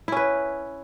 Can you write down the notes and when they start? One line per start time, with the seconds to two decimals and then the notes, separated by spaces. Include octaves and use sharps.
0.08 E4
0.12 C#4
0.17 B4